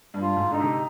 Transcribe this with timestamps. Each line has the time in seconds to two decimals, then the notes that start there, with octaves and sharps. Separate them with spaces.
0.14 G2
0.22 F4
0.37 G#2
0.52 D3 D#4
0.60 C3